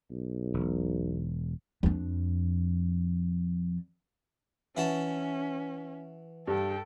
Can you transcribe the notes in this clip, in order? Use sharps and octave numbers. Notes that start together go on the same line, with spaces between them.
B1
E1
F2 D4
E3 C#4 F#4 A5
G2 A4 G5